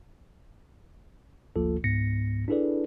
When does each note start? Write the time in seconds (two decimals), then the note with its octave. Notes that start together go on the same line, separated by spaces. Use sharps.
1.56 G#1 D2 F3 A#3 F4 A4
1.84 C#2 G#2 B3 A#6 C#7
2.48 D4 E4 G#4 A4 B4 D5